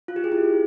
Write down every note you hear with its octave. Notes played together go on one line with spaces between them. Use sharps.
F4
G4
G#4
E4